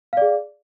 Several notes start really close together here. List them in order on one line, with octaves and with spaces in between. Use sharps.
F5 D5 G#4